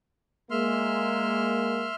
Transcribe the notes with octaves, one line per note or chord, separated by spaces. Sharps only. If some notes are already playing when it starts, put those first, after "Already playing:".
G#3 A#3 E5 C6 F6